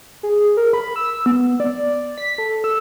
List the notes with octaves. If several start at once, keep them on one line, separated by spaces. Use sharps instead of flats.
G#4
A#4
B5
E6
B3
D5
B6
A4
E6